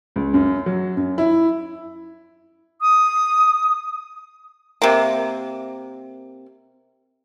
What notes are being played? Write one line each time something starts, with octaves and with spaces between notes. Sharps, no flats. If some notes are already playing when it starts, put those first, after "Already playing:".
C#2
F#2
F#3
F#2
E4
D#6
C3 A#3